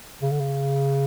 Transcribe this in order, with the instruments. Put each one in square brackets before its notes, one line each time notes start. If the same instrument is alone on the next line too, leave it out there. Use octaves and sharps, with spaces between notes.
[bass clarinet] C#3
D3
C#3